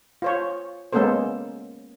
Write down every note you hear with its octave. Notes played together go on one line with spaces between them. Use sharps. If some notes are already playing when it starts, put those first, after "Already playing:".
F4 C5 C#5
G#3 A#3 B3 C#4 A4 C5